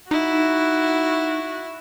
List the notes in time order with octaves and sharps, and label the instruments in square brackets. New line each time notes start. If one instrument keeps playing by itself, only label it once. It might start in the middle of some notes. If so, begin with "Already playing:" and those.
[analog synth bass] D#4 [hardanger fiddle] E4 [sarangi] F#4